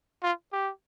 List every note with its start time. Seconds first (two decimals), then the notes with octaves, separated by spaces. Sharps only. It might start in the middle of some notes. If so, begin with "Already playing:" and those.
0.23 F4
0.52 G4